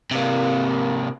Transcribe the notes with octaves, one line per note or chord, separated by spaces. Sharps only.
C3 A#3